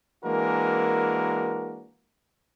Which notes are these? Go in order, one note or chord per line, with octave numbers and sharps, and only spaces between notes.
E3 G#3 A#3 D4 F#4 A#4